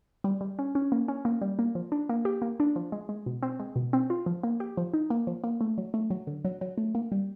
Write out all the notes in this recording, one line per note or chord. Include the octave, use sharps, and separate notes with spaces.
G3
G3
C#4
C#4
A#3
C#4
A#3
G3
A#3
F3
D4
A#3
G4
A#3
D4
F3
G#3
G#3
B2
C4
G#3
B2
C4
F4
F3
A#3
G4
F3
D#4
A#3
F3
A#3
A3
F#3
A3
F#3
D3
F#3
F#3
A3
A#3
G3